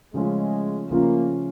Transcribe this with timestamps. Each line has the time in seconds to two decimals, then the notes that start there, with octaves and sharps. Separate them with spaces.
0.13 C#3 F3 G#3 A3 C#4 F4
0.90 C#3 F3 A3 A#3 C#4 F4